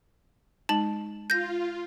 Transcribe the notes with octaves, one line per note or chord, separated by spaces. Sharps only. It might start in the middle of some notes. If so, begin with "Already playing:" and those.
G#3 D#4 A5 F#7
F4 G6 A#6